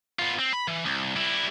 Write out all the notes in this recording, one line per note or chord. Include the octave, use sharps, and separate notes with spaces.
B3 F4
C4
B5
E3
C2
G3 E4